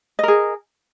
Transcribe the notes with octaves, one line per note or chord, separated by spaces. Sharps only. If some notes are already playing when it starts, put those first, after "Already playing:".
G#4 A#4 D#5